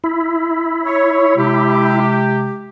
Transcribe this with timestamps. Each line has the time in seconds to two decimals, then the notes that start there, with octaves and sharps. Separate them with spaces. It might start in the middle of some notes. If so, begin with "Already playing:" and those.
0.04 E4
0.85 C#5
1.36 C3 G#3 G4